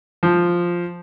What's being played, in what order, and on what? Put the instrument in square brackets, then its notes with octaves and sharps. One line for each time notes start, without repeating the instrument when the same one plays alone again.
[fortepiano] F3